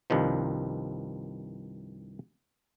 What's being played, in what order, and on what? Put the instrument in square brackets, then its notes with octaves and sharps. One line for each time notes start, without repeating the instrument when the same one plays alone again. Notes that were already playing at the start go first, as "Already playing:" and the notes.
[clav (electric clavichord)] C2 G2 D#3 F3